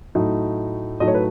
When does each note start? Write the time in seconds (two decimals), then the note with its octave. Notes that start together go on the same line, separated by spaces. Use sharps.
0.15 A2 F#3 A3 D#4
1.00 A2 F#3 A3 D#4 D#5
1.07 C#5
1.15 B4